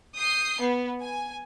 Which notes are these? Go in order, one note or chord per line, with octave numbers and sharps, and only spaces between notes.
D#6 G6 C7
B3
G#5